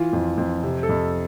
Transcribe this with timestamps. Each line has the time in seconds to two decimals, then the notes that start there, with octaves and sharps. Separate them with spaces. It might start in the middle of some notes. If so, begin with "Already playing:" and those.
Already playing: E3 F4
0.13 F2
0.38 F2
0.63 C3
0.83 A4
0.89 F2